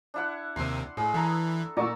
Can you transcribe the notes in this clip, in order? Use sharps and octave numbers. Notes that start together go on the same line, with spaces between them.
D4 E4 F#5
D#2 C3 C6
A2 G#4
E3 A4 A#5
A#2 D5 A#5 C#6 E6